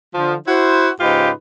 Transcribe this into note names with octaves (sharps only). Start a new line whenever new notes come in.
D3 F3
E4 F#4 C5
G#2 C#3 D#4 F4 G4 B4